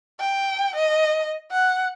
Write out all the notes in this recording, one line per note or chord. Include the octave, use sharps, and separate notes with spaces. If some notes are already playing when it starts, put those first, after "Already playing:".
G5
D#5
F#5